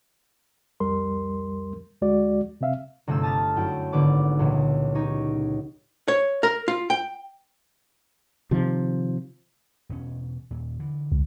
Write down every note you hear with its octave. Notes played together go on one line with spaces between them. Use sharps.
C2 F2 G3 A#4 C6
D2 G#3 F#4 D5
C3 C4 E5 F5
G1 C3 A3 G#4 E6
A5 D#6 F6 A6 B6
F#2 E4 G5
G#1 D3 B3 B4 D6 D7
C#2 A#2 C#3 E3
C#4 D#4 G4 C#5
C#5
A#4
F4
G5
C3 D#3 F3
E1 B2 C#4
D#2 A#2
D3 E3
C#2